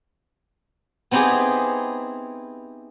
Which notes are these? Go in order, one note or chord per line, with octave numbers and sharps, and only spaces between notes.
B3 C4 D#4 E4 G4 G#4